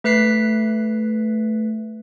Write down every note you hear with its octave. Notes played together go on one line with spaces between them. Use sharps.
A3 B4 F#6 B6 C7